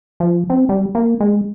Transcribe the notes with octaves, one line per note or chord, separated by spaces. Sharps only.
F3
C4
G3
A#3
G#3